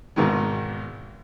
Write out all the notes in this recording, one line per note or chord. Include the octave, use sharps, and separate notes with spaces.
G#1 B2 D#3 E3 G#3